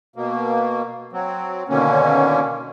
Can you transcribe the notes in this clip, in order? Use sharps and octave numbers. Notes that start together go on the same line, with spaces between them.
B2 A#3
F#3 C4
B2 D3 D#3 A#3 C#4